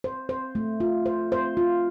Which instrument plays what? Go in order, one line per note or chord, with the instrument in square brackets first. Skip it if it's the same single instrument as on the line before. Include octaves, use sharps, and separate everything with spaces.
[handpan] C5
C5
A3
F4
C5
C5
F4